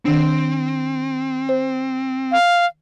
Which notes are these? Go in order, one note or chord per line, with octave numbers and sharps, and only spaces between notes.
D#3 C4 D4
C5
F5